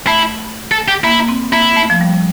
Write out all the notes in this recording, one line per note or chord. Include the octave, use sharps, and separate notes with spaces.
A3 E4
A4
G4
A#3 E4
A#3
C4
A#3 E4
A3
F3
G3